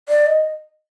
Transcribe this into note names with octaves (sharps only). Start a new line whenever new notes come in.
D5
D#5